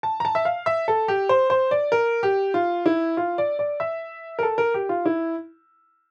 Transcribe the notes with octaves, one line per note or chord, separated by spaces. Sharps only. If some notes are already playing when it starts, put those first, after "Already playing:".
A5
A#5
A5
E5
F5
E5
A4
G4
C5
C5
D5
A#4
G4
F4
E4
F4
D5
D5
E5
A#4
A4
A#4
G4
F4
E4